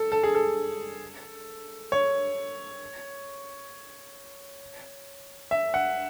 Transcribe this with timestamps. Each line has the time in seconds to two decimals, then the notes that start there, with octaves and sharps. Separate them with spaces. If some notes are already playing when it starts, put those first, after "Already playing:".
Already playing: A4
0.12 A4
0.23 G#4
0.35 A4
1.92 C#5
5.51 E5
5.74 F#5